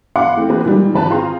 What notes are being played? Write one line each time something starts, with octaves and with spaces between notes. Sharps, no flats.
F5 F#5 B5 C6 D6
E3 A3 C4
A#3 C4 F#4 G#4 A#4 B4
A#2 D#3 G3 G#3
G#1 B4 A5 A#5
C4 F4 G#4 A#5 C6